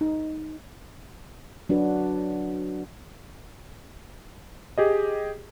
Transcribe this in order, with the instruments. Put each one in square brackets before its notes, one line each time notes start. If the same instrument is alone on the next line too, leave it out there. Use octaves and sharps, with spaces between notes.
[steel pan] D#4
[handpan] F#3 D4 F#4 B4
[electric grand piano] G4 G#4 D#5